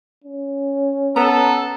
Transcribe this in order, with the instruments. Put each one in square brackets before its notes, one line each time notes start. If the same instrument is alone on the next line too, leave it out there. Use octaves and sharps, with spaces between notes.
[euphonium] C#4
[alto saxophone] B3 [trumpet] A4 [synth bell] A#5